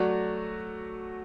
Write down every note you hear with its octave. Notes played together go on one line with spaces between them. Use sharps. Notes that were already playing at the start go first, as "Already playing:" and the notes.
Already playing: F#3 A3 F#4 D5